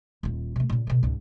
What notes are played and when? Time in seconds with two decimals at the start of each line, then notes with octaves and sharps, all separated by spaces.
0.23 D#1 F4
0.56 C3 A3
0.70 A#2 C#3
0.87 B2 D3
1.03 C#2 G#2